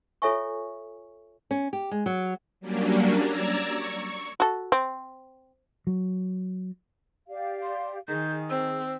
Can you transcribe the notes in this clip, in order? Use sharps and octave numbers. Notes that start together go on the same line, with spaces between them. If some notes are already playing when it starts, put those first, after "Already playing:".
F4 A4 C#5 E5 G#5 C#6
C#4
G4
G#3
F#3
F#3 G3 A#3 C#4 D4
D5 A#5 E6 G#6
C#6
F#4 A4
C4
F#3
G4 D5 F5
C6
D#3 G#4 G6
C4 E6